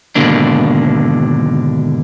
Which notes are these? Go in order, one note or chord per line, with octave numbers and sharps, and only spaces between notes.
D#2 G#2 B2 D3 A#3 D4